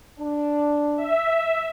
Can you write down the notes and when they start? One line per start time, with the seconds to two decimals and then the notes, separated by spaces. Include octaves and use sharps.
0.19 D4
0.96 E5